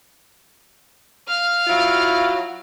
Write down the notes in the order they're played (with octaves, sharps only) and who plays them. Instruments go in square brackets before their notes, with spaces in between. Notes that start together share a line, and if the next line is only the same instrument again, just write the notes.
[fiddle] F5 F6
[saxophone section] F#3 E4 F4